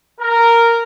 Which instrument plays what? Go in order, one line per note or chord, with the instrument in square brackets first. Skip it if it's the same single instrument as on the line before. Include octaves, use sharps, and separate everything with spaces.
[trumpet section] A#4